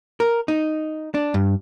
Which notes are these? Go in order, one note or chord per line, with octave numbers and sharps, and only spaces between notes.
A#4
D#4
D4
G2